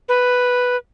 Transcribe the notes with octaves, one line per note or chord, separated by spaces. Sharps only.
B4